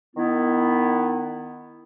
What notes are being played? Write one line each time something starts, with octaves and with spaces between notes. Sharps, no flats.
D#3 B3 E4